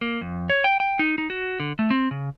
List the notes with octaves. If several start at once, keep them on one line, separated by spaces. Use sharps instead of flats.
A#3
F2
C#5
G5
G5
D#4
D#4
F#4
D3
A3
C4
C#3